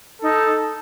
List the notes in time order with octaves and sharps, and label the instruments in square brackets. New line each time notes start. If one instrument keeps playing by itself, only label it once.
[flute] D#4 [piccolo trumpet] A4